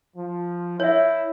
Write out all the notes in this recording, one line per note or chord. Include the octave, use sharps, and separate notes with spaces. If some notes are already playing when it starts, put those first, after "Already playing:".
F3
E4 C#5 E5